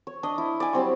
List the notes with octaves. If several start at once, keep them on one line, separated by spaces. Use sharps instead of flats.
C#5
D4 D#5
E4
D5 G#5
F#3 G3 C4 C#6